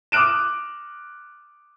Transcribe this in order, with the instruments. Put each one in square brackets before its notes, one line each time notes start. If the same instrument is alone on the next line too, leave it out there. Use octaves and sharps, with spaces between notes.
[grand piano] D6 D#6 F6 F#6 D7 E7